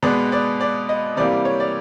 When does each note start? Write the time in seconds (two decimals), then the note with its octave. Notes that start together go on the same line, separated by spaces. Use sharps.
0.03 B2 G#3 B3 D5
0.32 D5
0.60 D5
0.89 D#5
1.17 C3 E3 G3 A#3 D5
1.45 C#5
1.60 D5